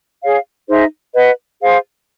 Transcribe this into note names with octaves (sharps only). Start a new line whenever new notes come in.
G#4 C#5 F5
D#4 G#4 C5 E5
B4 D#5 F#5
G#4 C5 F5